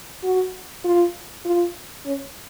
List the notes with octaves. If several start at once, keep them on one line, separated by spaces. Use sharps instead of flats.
F#4
F4
F4
C#4